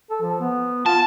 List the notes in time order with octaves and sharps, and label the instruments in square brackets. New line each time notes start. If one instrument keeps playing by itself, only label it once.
[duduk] A4
F3
B3
[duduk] F4 [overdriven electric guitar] A5